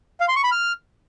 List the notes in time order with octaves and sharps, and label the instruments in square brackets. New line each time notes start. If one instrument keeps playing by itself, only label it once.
[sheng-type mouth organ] F5
C6
C#6
B5
F6